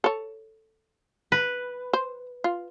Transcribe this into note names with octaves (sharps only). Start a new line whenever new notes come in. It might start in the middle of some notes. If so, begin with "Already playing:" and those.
A4 C#5
B4
C5
F4